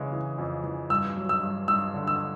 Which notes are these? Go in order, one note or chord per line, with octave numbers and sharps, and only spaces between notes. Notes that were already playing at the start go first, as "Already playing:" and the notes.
Already playing: C#3 E3 G#3
E3
F2
E3
G2 E6
F#3
E6
G2
G2 E6
D3
E6